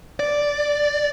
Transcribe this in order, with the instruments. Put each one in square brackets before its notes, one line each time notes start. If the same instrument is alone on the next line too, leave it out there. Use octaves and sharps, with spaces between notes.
[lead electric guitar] D5